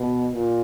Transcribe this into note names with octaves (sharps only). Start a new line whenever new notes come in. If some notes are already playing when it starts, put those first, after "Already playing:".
Already playing: B2
A#2